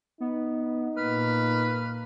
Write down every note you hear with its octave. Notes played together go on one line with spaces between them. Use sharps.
B3 D#4
A#2 A#3 B4 F6